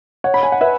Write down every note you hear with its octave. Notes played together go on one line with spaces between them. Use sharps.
C#5 F#5
B5
G#5
F#5
B4 E5